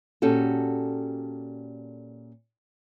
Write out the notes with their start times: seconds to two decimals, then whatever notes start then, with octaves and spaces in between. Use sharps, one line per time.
0.22 A#2 C#4 F#4 G4 A4